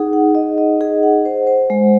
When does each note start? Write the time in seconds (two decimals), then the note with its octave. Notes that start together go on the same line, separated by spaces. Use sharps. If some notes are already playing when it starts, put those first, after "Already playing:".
Already playing: D#4 G#4 F#5
0.13 F#5
0.35 D#5
0.58 D#5
0.81 G#4
1.03 F#5
1.25 C5
1.47 C5
1.70 G#3